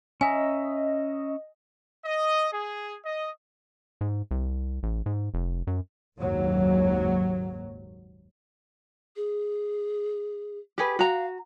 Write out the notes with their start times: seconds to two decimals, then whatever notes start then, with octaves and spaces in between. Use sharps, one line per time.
0.21 C#4 D#5 E5 G#5 A#5
2.05 D#5
2.52 G#4
3.05 D#5
4.01 G#2
4.31 C2
4.83 A1
5.06 G#2
5.34 F1
5.67 F#2
6.19 F#1 D#2 G#2 F#3
9.16 G#4
10.78 G4 G#4 B4
10.99 F#4 F5 A#5